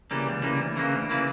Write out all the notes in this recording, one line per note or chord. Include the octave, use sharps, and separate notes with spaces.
C#3 E3 G3 A#3
C#2
C#3 E3 G3 A#3
D2
C#3 E3 A#3
D2
C#3 E3 A#3